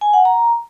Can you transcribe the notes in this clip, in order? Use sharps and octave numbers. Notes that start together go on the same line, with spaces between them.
G#5
F#5
A#5